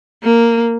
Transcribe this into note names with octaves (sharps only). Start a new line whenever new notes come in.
A#3